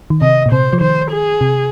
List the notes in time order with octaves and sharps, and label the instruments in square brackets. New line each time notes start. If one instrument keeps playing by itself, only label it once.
[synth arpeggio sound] D#3
[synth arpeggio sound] C3 [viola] D#5
[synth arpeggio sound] A#2
[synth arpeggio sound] C3 [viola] C5
[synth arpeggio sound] F3
[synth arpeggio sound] D#3 [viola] C5
[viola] G#4
[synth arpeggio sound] C3